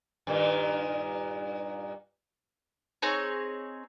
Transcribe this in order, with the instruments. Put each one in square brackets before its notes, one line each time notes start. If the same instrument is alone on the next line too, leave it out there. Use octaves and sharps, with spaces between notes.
[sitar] G2 A#2 D#3
[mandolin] C4 D#4 G#4 C#5